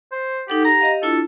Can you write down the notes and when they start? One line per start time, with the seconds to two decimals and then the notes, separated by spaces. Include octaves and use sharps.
0.12 C5
0.48 D#4 G4 A4 F#5
0.65 G4 F#5 A#5
0.81 G4 D#5 F5
1.03 D4 E4 F4 A4